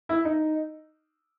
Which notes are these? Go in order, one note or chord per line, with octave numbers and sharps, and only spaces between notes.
E4
D#4